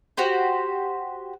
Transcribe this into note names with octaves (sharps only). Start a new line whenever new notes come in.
F#4 G4 C5